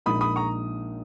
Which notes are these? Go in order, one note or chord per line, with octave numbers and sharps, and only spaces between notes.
A#1 A#2 G#3 D#4 B5 D#6
B5 D#6
A#5 C#6